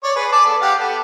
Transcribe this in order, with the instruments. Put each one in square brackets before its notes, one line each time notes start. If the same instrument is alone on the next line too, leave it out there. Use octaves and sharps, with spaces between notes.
[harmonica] C#5 D5
G#4 B4
D5 A5 D6
B3 A4
G4 F5 F#5
B3 A4